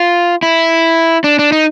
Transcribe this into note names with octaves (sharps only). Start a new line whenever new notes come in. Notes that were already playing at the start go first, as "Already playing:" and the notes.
Already playing: F4
E4
D4
D4
D#4